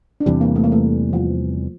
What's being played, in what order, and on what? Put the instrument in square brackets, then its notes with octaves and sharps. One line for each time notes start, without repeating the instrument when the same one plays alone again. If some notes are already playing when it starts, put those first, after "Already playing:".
[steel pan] D4
[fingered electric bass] E2 C3 E3 G3 [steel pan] C4
[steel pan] A#3
A3
A#3
A3
F3